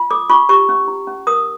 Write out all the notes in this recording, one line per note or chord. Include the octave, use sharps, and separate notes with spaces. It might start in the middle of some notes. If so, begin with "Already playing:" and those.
Already playing: F4
A4 D6
F4 C#6
G4 C#6
C#4
E4
C#4
A#4 D#6